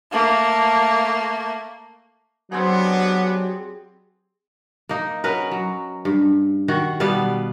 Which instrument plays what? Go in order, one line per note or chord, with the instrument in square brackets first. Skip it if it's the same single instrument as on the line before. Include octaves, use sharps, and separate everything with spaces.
[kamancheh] A3 A#3
[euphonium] F#3 [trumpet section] B3 D4 [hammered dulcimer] C4 G4 G#4
[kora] A#3 D#4
C#4 F#4 A#4 B4
F#3
G2
D#3 F#4
B2 G3 B3 F5